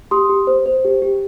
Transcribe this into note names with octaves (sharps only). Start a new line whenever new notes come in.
G4 C6 D#6
G4
C5
C5
G4
G4